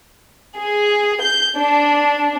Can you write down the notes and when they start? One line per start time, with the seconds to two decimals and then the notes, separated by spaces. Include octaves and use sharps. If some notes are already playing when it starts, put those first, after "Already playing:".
0.58 G#4
1.23 G6
1.57 D4